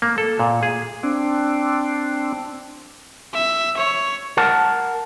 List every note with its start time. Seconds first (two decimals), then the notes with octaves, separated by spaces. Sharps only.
0.02 A#3
0.18 A4
0.40 A#2
0.63 G#4
1.03 C4 D4
3.34 E5
3.77 C#5
4.37 A#4 F#5 A5